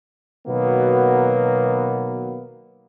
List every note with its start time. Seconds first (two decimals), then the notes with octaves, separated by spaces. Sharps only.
0.47 B2 D#3 F#3 A#3 B3